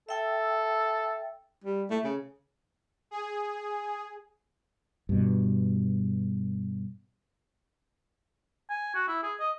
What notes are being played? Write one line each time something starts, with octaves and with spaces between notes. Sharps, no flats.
A4 E5 G5 E6
G3
A3
C#3
G#4
G2 B2
G#5
F#4
E4
G#4
D#5